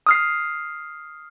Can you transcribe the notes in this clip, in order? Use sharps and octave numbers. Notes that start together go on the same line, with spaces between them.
D#6 F6 C7